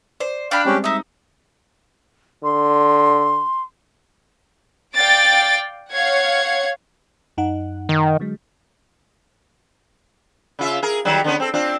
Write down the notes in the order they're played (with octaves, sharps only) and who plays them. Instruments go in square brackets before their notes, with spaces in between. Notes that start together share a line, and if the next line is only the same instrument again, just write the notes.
[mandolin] C5 [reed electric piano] D5
[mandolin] D4 B5 [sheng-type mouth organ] F5 G5
[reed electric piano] G3 G#3 C4 [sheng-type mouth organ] C#4 G4
[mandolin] D#4 D#6 [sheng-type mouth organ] E5
[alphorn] D3 [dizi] C6
[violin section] D5 F5 G5 A6 D7
C#5 F5 F#5 G#6 C#7
[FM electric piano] F#2 D#4 F#5
[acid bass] D#3
[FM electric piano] D3 F#3 G#3
[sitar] C#3 F4 E5
G#4 A#4
D#3 F#3 G3
D3 B3 C#4
C4 A4
C4 D4 F4